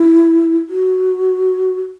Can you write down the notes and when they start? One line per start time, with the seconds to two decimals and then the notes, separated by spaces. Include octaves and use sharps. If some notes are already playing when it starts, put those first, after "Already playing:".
Already playing: E4
0.69 F#4